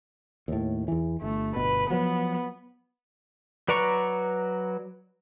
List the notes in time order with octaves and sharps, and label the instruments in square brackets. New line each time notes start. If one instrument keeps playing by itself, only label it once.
[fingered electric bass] D#2 A2
E2 E3
[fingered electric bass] G1 [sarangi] A3
[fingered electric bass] G1 B2 [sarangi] B4
[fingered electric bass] F3 F#3 [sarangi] B3
[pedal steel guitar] F#3 B4 D5 A#5 C#6